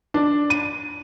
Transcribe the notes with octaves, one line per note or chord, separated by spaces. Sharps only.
D4
D#7